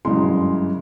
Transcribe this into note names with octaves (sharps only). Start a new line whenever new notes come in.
G1 F#2 C#3 E3 G#3 C6